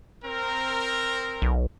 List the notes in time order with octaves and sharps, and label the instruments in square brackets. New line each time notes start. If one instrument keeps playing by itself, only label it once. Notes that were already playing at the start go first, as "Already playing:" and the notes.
[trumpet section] C4 A#4
[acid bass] B1